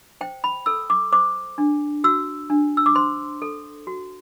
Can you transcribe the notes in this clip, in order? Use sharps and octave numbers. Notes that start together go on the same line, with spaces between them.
C5 G5
B5
A4 E6
D6
C5 D6
D4
F#4 E6
D4
E6
D6
C5 C6
A4
F#4